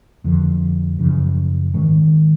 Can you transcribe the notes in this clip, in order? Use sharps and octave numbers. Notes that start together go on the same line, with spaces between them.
F2 D3 F3
F#2 C#3 F3
G#2 D#3 G#3 C#4